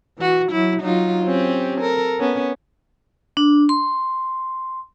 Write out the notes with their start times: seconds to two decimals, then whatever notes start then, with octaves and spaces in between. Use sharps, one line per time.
0.18 E3 F#4
0.50 F#3 E4
0.81 F#3 D#4 F4
1.25 C4 C#4 G4
1.81 A4 A#4
2.20 B3 C#4
3.37 D4
3.69 C6